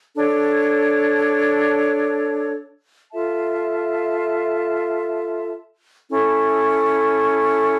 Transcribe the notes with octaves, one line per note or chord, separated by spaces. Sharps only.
D4 A4 C#5
F4 A4 E5 A5
C#4 E4 A4